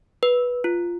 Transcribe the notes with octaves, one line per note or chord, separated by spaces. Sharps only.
B4
F4